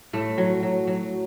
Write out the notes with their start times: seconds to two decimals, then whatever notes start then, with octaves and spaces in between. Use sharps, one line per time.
0.13 A2 A3
0.38 F#3
0.63 F#3
0.87 F#3